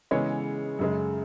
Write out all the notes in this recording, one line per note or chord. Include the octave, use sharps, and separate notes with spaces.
C#3 E3 G#3 B3 C#5
F#2 C#3 G#3